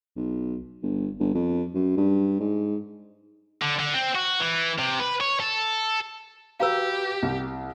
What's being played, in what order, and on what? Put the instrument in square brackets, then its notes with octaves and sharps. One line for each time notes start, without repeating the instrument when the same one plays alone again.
[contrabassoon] B1
G1
G1
F2
F#2
G2
G#2
[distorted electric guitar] D3
D3
C4
F#4
E3
C3
B4
C#5
A4
[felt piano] F#4 B4 [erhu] G4 [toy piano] F5 A#5 E6
[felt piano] C2